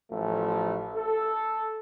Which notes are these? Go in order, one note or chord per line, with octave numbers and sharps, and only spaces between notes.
A1 F3 A3
A4